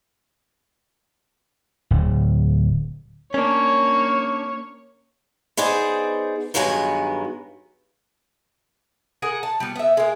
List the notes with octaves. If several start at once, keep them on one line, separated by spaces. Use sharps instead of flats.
D1
A#3 C#4 D4 C#5
B3 D#4 G#4 C5 D5
G2 D#3 F#3 G#3 B3 G#5
G#4 A#4 F#5
A5
G3 B3
B3 E5
G#3 A#3